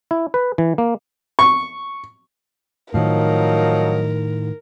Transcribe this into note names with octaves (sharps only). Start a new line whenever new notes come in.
E4
B4
E3
A#3
C#6
A2 D#3 F3 F#3 D#4 A#4